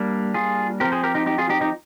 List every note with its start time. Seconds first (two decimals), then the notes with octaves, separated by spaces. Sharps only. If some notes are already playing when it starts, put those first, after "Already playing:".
Already playing: G3 A#3 D4
0.34 F4 G#4
0.80 C4 G4 A#4
0.84 F3
0.92 G#4 C5
1.03 G4 A#4
1.15 D#4 G4
1.26 D#4 G4
1.38 F4 G#4
1.49 D#4 G4
1.61 D#4 G4